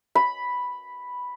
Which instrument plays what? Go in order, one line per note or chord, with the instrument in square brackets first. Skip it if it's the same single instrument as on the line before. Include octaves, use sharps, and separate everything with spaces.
[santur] B5